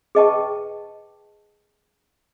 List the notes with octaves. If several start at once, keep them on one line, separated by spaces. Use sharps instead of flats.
G#4 B4 D#5 G5 A5 C#6